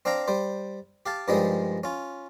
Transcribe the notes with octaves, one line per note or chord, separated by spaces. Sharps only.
C4 D4 F5 G5 A#5
G3 C5
G4 F5 A5
G2 D#3 F3 G3 G#3 D#6
C#4 F4